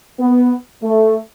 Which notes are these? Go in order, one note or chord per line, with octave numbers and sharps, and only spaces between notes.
B3
A3